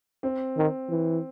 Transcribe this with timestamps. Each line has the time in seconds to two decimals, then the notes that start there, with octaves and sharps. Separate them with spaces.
0.23 C4
0.57 D#3
0.90 E3